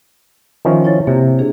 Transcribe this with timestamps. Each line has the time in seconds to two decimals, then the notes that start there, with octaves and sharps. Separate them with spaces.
0.65 D#3 F3 C#4 E5
0.84 E4 C#5 A6
1.07 C3 A#3
1.39 D4 G#4